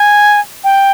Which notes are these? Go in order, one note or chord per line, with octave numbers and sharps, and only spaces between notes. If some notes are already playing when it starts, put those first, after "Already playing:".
Already playing: G#5
G5